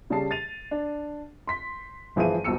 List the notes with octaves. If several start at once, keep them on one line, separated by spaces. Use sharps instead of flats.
C#3 G3 C#4 G#4 A5 C7
A6 D#7 F7
D4
C6 B6
G1 E3 F3 G#4 E5 D#7
D#1 B1 B2 E6 C#7